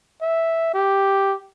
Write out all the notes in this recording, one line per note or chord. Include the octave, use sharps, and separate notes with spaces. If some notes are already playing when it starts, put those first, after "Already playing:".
E5
G4